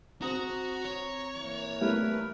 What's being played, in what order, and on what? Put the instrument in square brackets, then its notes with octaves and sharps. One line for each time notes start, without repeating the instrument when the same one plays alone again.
[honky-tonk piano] C4 D#6 E7 [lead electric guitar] F#4 [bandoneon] A#5
[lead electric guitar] C#5
[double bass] E3 A#3
[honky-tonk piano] G3 A3 E4 [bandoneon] A#4 B4